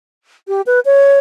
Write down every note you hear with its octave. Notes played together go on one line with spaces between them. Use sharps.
G4
B4
C#5